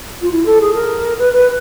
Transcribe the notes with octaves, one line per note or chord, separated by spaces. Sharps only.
F4
E4
A4
G#4
A#4
B4
B4